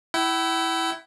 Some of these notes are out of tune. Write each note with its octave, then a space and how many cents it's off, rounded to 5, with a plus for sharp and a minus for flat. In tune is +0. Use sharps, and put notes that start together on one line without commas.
E4 +0 G5 -45